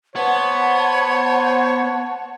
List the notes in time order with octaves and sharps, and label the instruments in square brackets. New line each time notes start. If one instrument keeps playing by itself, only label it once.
[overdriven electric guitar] B3 [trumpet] C5 [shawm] C#5 [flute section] F#5 A5